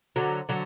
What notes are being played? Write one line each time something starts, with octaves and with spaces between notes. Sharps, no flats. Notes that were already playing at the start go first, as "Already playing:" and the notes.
D3 F#3
D3 F#3